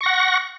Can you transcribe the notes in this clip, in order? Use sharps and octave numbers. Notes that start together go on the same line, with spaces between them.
F#5 C#6 A#6